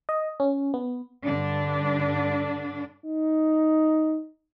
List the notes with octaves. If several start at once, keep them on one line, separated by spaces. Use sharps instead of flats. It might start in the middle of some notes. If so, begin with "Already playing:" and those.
D#5
C#4
B3
G2 D3 D4
D#4